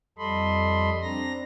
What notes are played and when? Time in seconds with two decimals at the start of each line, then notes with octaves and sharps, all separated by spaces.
0.18 F2 G3 A4 D#5 B5 C6
1.02 C4 D4 A#5 A#6